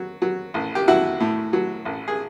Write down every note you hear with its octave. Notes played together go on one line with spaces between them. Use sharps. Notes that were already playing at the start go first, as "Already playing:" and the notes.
Already playing: F#3
F#3
A1
G4
F#3 E4 F#4
A2
F#3
A1
G#4